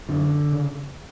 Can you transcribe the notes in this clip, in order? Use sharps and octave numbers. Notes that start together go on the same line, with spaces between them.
F#2 D3 D4
C#3